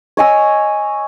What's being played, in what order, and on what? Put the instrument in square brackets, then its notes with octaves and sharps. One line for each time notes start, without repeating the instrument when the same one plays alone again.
[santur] C#5 D#5 G#5 E6